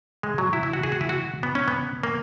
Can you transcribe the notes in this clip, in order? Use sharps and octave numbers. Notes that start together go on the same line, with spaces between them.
G#3
F#3
E4
E4
F#4
G#4
F#4
E4
F#4
B3
C#4
B3
A#3